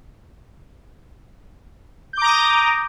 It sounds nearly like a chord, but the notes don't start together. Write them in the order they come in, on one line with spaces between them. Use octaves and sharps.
G6 D6 A#5 D#6